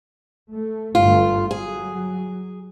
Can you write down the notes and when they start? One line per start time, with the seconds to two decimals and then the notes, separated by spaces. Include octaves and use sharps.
0.52 A3
0.95 G1 G2 A3 F4
1.51 F#3 G#4